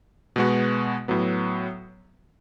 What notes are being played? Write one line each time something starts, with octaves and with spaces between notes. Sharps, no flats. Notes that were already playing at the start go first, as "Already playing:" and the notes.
B2 G#3 B3 F#4
A2 F#3 B3